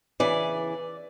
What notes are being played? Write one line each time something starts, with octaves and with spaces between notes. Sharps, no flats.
C#3 E3 D5